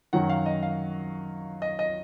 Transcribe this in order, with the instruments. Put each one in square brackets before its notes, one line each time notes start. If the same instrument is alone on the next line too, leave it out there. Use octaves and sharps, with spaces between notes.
[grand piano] F#2 D#3 F#3 F#5
F5
D#5
F5
D#5
D#5